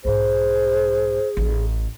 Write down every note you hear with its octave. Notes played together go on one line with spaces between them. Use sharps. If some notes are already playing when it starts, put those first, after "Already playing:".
B1 G#2 G#4 C5
A1 E4